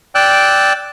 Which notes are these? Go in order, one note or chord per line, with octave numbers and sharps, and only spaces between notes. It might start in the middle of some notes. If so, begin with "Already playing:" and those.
D5 G5 E6 F#6